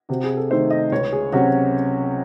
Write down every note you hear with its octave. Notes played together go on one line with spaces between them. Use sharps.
C3 F#4
G#4
A4
D#3 A3 D#4 C5
D#5
C#2 C#5
G#4
C3 F#3 C#4 F#4